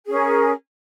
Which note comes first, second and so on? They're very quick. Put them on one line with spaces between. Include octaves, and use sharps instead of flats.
G#4 C#4 A#4